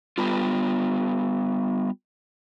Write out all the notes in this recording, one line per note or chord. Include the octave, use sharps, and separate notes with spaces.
G3 B3 F4